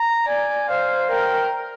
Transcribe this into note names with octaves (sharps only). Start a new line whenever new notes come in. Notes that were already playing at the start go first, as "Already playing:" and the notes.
Already playing: A#5
D5 G#5
C5 F5
A#4 G5